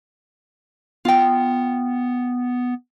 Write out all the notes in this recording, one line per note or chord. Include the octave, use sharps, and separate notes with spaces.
B3 F4 G5